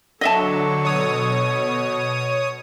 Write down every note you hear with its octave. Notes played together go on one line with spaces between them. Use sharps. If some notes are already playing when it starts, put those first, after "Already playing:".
D3 F#3 A4 D#5 E5 A5 C#6
B2 C#5 D#6